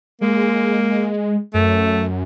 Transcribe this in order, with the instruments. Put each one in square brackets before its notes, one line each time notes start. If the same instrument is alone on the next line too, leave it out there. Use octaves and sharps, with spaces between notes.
[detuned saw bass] G#3 [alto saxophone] A#3
[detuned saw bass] F#2 [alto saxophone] A3